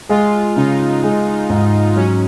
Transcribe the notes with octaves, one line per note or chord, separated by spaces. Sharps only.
G#3 F4
C#3 D#4
G#3
G#2
F#3 C#4